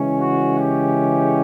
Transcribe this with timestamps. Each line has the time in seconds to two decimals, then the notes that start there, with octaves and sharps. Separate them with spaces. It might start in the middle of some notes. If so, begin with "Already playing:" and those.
Already playing: C#3 E3 G#3 C#4
0.19 F#4
0.58 G4